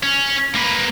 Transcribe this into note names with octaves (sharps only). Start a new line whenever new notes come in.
C#4
A#3 B4